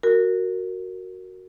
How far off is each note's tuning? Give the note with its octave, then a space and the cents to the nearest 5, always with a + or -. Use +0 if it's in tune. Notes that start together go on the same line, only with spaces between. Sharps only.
F#4 +0 A#4 -15